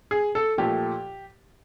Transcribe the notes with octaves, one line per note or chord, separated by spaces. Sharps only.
G#4
A4
A#2 F3 A3 G4